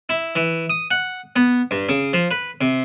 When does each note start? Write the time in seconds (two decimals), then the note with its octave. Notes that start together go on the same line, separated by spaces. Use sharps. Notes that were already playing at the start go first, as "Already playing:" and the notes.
0.09 E4
0.35 E3
0.70 D#6
0.91 F#5
1.36 B3
1.71 G2
1.89 C#3
2.13 F3
2.31 B4
2.61 C3